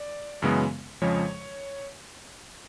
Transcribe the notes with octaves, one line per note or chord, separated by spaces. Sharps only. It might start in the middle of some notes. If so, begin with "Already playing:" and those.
Already playing: D5
F#2 C#3 E3 G#3 B3
F2 C#3 F3 G#3 C#5